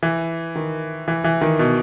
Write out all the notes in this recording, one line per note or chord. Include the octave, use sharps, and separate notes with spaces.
E3
D#3
E3
E3
D#3
B2